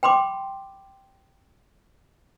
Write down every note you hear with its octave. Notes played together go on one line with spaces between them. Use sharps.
G5 B5 C6 D6